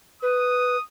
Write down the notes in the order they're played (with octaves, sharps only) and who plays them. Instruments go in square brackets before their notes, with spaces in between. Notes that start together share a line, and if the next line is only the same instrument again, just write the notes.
[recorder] B4 [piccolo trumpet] D#6